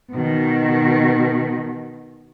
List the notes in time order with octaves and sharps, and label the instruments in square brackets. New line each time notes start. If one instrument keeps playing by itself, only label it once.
[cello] B2 D#3